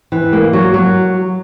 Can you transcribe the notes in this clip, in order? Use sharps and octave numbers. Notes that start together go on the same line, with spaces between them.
E3
A#3
F#3
F#3